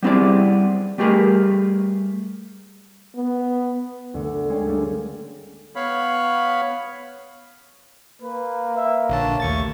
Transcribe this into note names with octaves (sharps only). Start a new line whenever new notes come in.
G3 B3 C4 E4 G#4 D5
G3 A3 G4 G#4 A#4 B4
B3
D2 D3
G#3 C#4 G#4 C#5 G5
G3 A3 A#3 C#4 D4
B3 C#5 F5 B5
A#3 B4
E5
A#1 D3 C#5 A5
D#2 A3 C#6 A6